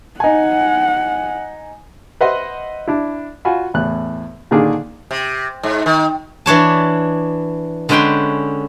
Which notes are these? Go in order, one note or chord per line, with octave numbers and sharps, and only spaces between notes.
D#4 F#5 G#5
B4 C5 D#5 E5 F#5 C6
D4 E4
F4 F#4 G#5 B5
E2 A2 F#6
A#2 D3 D#3 A#3 D4 G#4
C3
G#2
D#3
E3 D4 C#5 A5
D3 G#3 C#4 B4 G5 C6